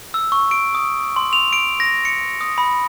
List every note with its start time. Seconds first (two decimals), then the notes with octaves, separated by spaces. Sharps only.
0.14 E6
0.32 C#6
0.51 D7
0.75 D#6
1.16 C6
1.33 F7
1.53 D7
1.80 A#6
2.05 C#7
2.41 D#6
2.58 B5